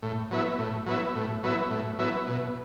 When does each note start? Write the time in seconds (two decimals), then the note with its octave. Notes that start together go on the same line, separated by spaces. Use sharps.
0.02 A2
0.31 F#3 B3 E4
0.59 A2
0.86 F#3 B3 E4
1.15 A2
1.43 F#3 B3 E4
1.70 A2
1.99 F#3 B3 E4
2.27 B2